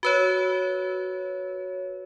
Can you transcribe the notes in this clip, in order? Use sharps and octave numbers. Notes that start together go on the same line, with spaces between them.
F#4 B4 C#5